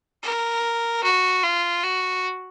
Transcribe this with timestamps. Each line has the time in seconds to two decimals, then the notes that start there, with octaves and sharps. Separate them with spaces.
0.23 A#4
1.03 F#4
1.44 F4
1.84 F#4